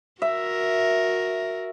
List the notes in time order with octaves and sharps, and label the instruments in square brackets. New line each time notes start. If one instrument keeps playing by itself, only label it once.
[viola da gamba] F#4 A#4 [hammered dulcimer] E5